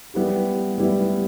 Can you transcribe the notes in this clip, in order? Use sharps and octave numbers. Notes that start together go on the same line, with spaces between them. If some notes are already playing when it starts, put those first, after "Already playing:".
G3 B3 E4 G4
G3 B3 E4 G4